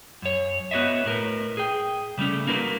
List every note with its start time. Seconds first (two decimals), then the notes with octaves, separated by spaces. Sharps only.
0.22 F#2 C#5
0.71 B3 F#4 C#5 D#5 E5
1.05 A2 A#4 B4
1.57 G#4 G5
2.18 C#3 G3 A3 C#4
2.47 A#3 D#4 F#4 A#4 B4